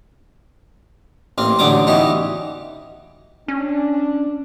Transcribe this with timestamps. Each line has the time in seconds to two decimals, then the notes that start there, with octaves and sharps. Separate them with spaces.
1.38 A1 A#3 C4
1.59 A1 D3 F#3 G5 D6 D#6
1.87 B2 E3 D#4 G4
3.48 C#4 D4